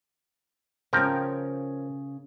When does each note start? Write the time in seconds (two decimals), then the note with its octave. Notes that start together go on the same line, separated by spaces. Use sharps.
0.93 C#3 F3 C#4 A#4 G5